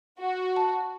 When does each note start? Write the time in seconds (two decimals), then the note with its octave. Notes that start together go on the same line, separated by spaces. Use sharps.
0.20 F#4
0.56 A5